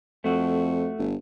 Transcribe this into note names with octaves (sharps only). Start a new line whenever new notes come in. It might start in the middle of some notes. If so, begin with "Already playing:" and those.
F2 A3 F#4
G1